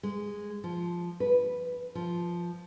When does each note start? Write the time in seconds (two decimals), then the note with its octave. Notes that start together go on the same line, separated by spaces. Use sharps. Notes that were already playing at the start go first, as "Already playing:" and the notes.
0.03 G#3
0.64 F3
1.20 B4
1.95 F3